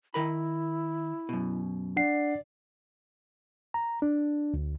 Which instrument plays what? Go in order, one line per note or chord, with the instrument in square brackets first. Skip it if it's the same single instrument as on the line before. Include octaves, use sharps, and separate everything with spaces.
[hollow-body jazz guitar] D#3 A#4 B5 [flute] E4
[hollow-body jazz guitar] F#2 B2
[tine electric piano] D4 F#5 C7 [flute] D5
[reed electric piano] A#5
D4
D2